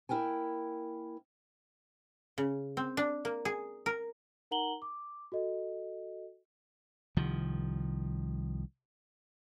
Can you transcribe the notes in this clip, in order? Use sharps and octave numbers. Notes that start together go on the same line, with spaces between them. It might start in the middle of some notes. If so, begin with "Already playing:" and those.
A#3 E4 A#4 G5 G#5
C#3
C4
D4
A#3
G#4
A#4
D#4 A#4 F#5 A#5 F#7 G7
D6
F#4 A4 D#5
C2 D#3 F3